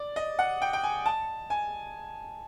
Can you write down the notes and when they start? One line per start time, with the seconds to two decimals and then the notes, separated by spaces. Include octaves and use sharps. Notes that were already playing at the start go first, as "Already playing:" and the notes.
Already playing: D5
0.16 D#5
0.39 F#5
0.62 G5
0.73 G5
0.83 G#5
1.06 A5
1.50 G#5